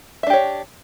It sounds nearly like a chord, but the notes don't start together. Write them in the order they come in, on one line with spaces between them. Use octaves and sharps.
E5 D4 G4 C#5